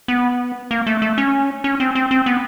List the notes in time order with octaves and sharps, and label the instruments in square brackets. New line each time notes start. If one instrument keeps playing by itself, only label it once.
[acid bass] B3
A#3
A3
A3
C#4
C#4
C4
C4
C4
B3